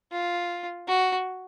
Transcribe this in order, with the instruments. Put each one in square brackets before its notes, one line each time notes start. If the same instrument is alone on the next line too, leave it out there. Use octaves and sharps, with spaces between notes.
[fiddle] F4
F#4